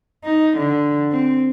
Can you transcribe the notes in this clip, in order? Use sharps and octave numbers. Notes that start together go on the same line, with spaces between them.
D#4
D3
C4